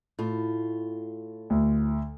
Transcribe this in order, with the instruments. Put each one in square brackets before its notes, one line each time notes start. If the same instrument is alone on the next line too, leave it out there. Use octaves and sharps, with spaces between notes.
[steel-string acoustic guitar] A2 F4
[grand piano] D2